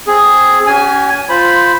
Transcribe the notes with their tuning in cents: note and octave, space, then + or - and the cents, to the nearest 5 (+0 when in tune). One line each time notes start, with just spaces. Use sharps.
C4 +0 G#4 +0
C#4 +25 F#4 +45 G#5 +0
F4 +0 C5 -10 B5 +0